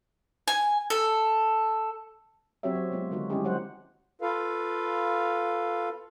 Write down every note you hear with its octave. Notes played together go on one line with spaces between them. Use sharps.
G#5
A4
F#3 C4 F#4 G4 C#5 E5
F#3
F#3 G#3 B3 F4
D3 D#3 G#3 D#4 F#4
G3 G#3 C#4 E4 G4 G#4
F#3 G3 G4 C5 F#5
F4 A4 B4 F5